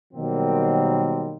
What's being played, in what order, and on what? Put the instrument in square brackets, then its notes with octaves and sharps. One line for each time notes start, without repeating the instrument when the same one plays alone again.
[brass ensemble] B2 D#3 F#3 G3 A#3 C4